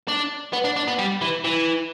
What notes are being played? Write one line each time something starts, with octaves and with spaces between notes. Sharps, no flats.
D4
B3
D4
D4
B3
G3
E3
E3